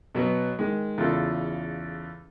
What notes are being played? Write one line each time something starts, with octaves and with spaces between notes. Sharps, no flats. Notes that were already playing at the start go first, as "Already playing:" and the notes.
B2 F#3 B3
D#3 G#3
E2 C#3 F4 A4